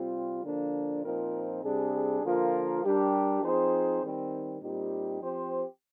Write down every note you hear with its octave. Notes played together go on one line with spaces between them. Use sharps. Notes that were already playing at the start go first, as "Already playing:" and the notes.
Already playing: C3 G3 C4 F4
D3 F3 A#3 D4
A#2 F3 C4 D#4 A#4
C3 G3 D4 G#4
D3 F3 A#3 F4 A#4
G3 D4 G4 A#4
F3 C4 D#4 G#4 C5
D#3 G3 C4
A#2 G3 C4 D#4 G4
F3 C4 G4 C5